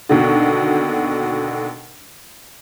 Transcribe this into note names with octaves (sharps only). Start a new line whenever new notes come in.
D#2 B2 D3